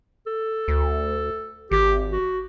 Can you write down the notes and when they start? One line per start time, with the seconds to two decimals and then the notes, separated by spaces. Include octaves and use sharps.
0.26 A4
0.68 D2
1.71 G#1 G4
2.12 F#4